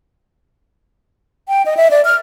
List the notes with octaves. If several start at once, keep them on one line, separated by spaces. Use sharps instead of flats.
G5
D#5
E5
D5
F6